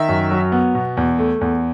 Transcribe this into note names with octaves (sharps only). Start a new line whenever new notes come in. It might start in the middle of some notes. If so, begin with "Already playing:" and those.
Already playing: D#3 E5
F#2
F#3
B3
B2
E2
A3
E2